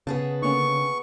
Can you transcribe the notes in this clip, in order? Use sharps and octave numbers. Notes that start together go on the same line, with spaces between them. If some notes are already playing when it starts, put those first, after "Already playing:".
C#3 B3 G#4 A5
D3 A#3 C#4 C#6